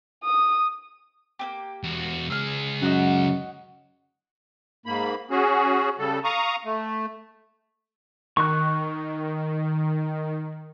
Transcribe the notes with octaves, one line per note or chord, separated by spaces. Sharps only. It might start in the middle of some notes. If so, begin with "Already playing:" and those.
D#6
A#3 C4 G4
E2 F#4
C#2 G#4 E6 F6
F#2 D#4 F#4 F#5
G#2 A#3 B5
C#4 F#4 G#4
C#3 G3 A4
F5 A#5 C#6 D#6
A3
D#3 C#6 F#6